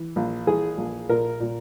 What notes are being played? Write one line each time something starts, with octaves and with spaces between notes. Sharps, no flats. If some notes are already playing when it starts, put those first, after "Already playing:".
Already playing: E3
A#1
E3 G#4
A#1
A#2 A#4
A#2